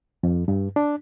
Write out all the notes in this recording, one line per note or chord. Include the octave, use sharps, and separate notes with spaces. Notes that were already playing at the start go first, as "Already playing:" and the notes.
F2
G2
D4